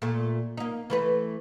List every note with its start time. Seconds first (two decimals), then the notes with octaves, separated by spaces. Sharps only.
0.02 A#2 A3
0.57 A#3 D#4
0.90 E3 A3 B4